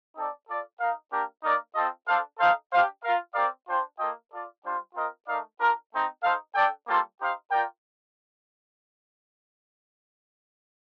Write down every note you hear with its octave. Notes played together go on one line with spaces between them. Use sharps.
C4 D#4 A4 D5
F4 A4 D5
D#4 A#4 F5
A#3 D4 G4 A#4
A#3 D#4 A#4 D5
C4 F4 A4 D#5
D4 A4 C5 F5
D#4 A4 C5 F5
D4 G4 C5 F5
F4 A#4 F5
C4 G4 A#4 D5 F5
D4 F4 C5 G5
A#3 F4 A4 D#5 G5
F4 A4 D5
G3 D4 F4 C5 G5
C4 F4 A#4 D#5
A3 D#4 A#4 D5 F5
D4 F4 A#4
A3 C4 D#4
D#4 A4 C5 F5
D4 A4 D5 G5
G3 A#3 F4 A4 C5
D#4 G4 C5 F5
F4 A#4 D5 G5